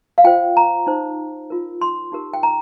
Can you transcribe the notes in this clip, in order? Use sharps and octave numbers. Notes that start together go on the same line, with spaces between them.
F5
F4 C5 G5
A#5
D#4 C5
F4 A#4
C6
D#4 G4 A#4
G5
A#5